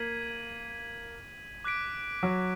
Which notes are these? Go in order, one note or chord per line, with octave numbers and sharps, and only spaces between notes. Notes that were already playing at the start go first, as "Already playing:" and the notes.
Already playing: A#3 G#6 B6 D#7 F#7
D6 F#6 B6 D7
F#3